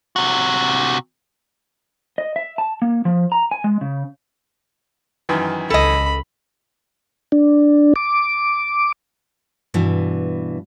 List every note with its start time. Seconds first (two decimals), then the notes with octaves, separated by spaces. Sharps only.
0.16 C3 F#4
2.18 D#5
2.36 E5
2.58 A5
2.82 A#3
3.05 F3
3.32 A#5
3.51 G#5
3.64 G#3
3.81 C#3
5.29 F#2 D#3 E3
5.70 C#2 A4 D#5 B5
7.32 D4
7.96 D6
9.74 G2 B2 E3